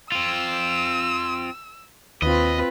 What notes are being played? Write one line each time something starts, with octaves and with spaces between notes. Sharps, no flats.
C4 F4 E6
D#2 C4 F4 B4 D#5